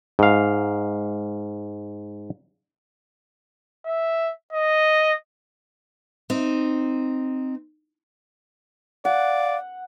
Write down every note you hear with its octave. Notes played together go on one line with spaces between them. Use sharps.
G#2 F5
E5
D#5
C4 D#4
D5 F5 F#5